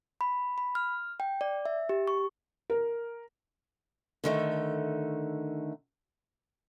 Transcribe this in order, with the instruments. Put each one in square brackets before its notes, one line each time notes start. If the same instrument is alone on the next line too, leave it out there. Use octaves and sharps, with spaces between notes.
[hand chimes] B5
B5
F6
G5
D5
E5
G4
C#6
[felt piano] A#4
[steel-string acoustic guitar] D3 D#3 A3